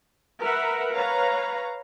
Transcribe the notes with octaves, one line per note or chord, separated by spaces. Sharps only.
A#4 B4 E5 F#5
B4 C#5 F5 A#5